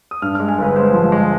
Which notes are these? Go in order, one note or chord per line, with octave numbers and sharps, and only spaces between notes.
D#6
G2 F6
G#3 F6
G#5
G1 B4
G#3 C5
F3
G#3